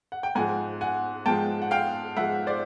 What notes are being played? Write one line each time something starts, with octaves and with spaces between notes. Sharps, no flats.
F#5
G5
G#2 F3 G#3 F#5 G#5
F#5 G#5
G#2 F3 G#3 G5 A5
F#5
F5 G5
G#2 F3 G#3 E5 F#5
C5 D5